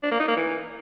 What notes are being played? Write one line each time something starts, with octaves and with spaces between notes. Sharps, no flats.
D4
A#3
D#4
A#3
E3